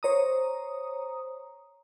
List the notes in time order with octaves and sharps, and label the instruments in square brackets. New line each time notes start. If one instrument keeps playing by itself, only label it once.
[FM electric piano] C5 C#5 A#5 D#6